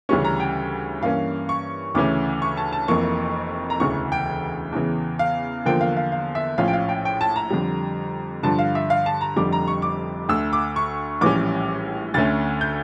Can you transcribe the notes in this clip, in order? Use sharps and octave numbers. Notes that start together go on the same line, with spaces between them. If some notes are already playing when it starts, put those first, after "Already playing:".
D2 C#3 E3 G3 C#4 C#6
A#5
G5
G2 E3 A#3 C#4 F5
C#6
D2 C#3 E3 A3 C#4 D6
C#6
A5
A5
F1 F2 E3 A#3 C#6
A#5
E1 D2 C#3 E3 C#6
G5
E2 C#3 E3
F5
E2 D3 F3 A#3 G5
F5
F5
F5
E5
A#1 A2 F3 C#4 F5
G5
F5
G5
G5
A5
A#5
F2 D3 G3
G2 D3 F3 A5
F5
E5
F5
A5
A#5
F1 F2 D3 G3 D6
A#5
C#6
D6
D2 D3 A3 E6
D6
C#6
A#1 A2 E3 G3 C#4 D6
D2 D3 A3 C#4 A6
G6